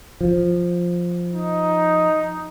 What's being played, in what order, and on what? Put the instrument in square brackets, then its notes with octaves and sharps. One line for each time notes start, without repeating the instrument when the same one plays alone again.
[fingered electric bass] F3
[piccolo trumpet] D#4